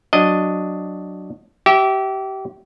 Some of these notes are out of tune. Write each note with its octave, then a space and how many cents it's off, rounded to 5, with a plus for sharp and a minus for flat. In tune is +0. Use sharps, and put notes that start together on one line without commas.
F#3 +0 D4 +0 D#5 +0
G4 -30 E5 -10